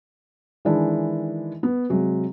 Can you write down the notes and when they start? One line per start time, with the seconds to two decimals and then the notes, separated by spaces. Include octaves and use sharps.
0.65 D#3 E3 G#3 D4 E4
1.63 B3
1.89 C3 F#3 G#3